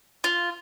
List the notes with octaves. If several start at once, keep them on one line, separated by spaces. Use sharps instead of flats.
F4